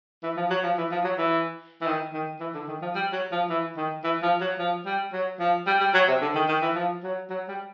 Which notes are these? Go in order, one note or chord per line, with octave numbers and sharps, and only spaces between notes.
E3
F3
F#3
F3
E3
F3
F#3
E3
E3
D#3
D#3
E3
D3
D#3
F3
G3
F#3
F3
E3
D#3
E3
F3
F#3
F3
G3
F#3
F3
G3
G3
F#3
C3
D3
D#3
D#3
E3
F3
F#3
F#3
G3